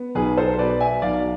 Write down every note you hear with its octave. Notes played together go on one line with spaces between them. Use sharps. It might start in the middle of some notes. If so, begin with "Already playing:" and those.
Already playing: B3
B1 G#4 B4
A4 C5
B2 B4 D5
E5 G#5
B1 D5 F5